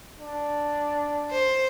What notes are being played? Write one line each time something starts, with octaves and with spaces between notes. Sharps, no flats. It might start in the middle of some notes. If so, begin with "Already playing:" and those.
D4
C5